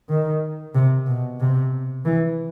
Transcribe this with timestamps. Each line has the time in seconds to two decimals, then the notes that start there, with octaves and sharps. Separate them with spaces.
0.09 D#3
0.75 C3
1.07 B2
1.40 C3
2.05 E3